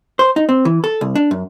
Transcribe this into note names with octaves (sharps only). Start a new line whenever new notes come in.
C5
D#4
C4
E3
A4
C2
D4
F#2